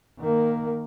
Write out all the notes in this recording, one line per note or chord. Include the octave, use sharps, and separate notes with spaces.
D#3 A#3